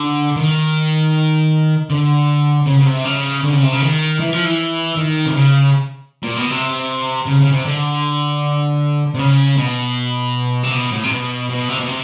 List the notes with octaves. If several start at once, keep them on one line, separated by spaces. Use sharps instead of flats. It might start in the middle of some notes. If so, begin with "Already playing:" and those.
Already playing: D3
D#3
D3
C#3
C#3
C3
C#3
D3
C#3
C3
C#3
D#3
E3
F3
E3
D#3
C3
C#3
A#2
B2
C3
C#3
C#3
C3
D3
C3
C#3
B2
C3
B2
A2
C3
B2
B2
C3
B2
C3